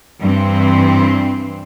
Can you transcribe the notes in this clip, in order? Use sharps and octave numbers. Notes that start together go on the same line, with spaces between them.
G2 E3 C4